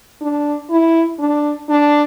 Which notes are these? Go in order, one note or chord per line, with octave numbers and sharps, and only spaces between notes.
D4
E4
D4
D4